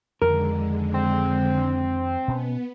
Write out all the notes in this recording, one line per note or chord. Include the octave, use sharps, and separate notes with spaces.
F2 D3 D#3 G#3 A#4
C4
B2 B3 C#4